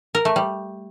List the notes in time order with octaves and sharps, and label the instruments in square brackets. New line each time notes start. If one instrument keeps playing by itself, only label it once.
[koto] A#4
A3
G3